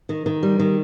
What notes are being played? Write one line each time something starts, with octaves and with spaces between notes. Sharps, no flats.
D#3
D#3
G3
D#3